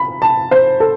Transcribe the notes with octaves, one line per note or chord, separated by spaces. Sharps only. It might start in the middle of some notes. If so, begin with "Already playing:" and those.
Already playing: B5
A5
C5
A4